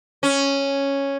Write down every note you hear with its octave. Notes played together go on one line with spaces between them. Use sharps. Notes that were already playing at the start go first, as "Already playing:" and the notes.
C#4